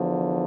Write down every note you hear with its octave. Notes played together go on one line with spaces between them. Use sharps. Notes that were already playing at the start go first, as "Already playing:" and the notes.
Already playing: E2 D3 F3